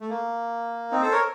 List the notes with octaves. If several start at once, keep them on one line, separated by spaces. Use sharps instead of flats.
A3
A#3
C4 D#4
A4 C5
A#4 C#5